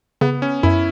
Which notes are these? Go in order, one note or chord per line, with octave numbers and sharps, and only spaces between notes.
C#3 B3
C#4
F#2 E4